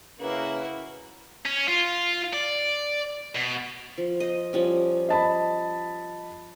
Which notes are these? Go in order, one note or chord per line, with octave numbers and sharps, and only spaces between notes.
C#3 A#3 E4 F#4 B4
C#4
F4
D5
B2
F3
C5 D#5
F3 G3 C#4
D#5 A5 B5